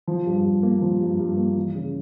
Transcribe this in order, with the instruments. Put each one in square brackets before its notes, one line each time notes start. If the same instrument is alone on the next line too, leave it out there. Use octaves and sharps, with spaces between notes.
[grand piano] F3
G2
G2
A#3
F3
G2
G2
A#3
E3
C#3